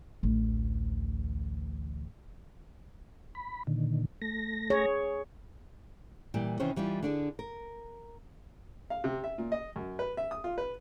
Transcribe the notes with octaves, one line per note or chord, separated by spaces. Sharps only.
A1 D2
B5
A#2 D3 D#3
A3 A#6
G#4 C#5
A#2 E3 G3
C3 D#3 E3 C#4 C5
E3 G3 D#4 F4
D3 D4 G#4
A#4
F5
C3
E5
A#2
D#5
F#2
B4
E5
D#6
F4
B4